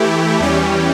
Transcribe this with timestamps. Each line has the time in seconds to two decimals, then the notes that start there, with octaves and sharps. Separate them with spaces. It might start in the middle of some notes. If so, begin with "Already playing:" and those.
Already playing: E3 A3 E4 G4
0.40 E2 E3 G3 C#4 G4